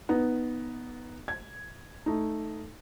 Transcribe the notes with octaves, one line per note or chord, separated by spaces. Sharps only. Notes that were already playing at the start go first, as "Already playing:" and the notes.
B3 D#4
G#6
A3 D#4